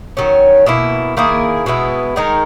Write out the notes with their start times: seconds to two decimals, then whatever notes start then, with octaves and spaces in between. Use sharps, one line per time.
0.17 D#3 F#3 C#4
0.66 B2 A#3 E4
1.17 D#3 A#3 E4 G#4
1.66 B2 G#3 B3 E4
2.16 D#3 G#3 D#4 A#4